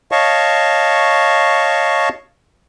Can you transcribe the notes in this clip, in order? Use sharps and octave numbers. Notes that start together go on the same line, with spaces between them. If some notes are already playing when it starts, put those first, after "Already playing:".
C#5 D#5 F5 A5 C#6